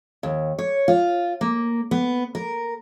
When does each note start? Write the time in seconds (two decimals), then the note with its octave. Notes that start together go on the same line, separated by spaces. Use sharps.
0.23 D#2
0.59 C#5
0.88 F4
1.41 A#3
1.91 B3
2.35 A#4